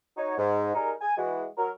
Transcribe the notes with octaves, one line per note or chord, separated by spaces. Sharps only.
D#4 F#4 C#5
G#2
G3 D#4 G#4 A#4
G#5
E3 G#3 F#4
F#3 A#4